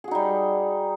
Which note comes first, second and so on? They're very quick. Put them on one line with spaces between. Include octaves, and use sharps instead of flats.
G#4 F#4 D#4 G3